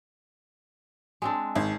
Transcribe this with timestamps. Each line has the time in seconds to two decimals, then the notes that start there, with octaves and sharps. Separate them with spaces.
1.22 G#3 C4 D4
1.56 G#1